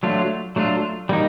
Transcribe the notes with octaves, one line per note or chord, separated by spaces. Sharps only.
F#3 A3 D4 F4
F#3 A3 D4 F4
G3 A#3 D#4